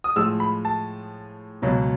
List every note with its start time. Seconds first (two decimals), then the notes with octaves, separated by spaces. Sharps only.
0.04 D#6
0.16 A2 F3 G#3 E6
0.40 B5
0.65 A5
1.62 C#2 B2 F#3